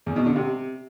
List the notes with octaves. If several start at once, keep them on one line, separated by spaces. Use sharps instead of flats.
E2
B2
D3
C3